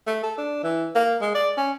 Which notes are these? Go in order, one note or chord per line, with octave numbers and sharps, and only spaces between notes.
A3
A4
D4
E3
A#3
G#3
D5
C#4